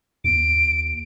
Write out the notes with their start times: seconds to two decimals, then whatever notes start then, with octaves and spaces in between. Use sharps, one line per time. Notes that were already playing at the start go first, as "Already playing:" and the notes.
0.24 D#2 D7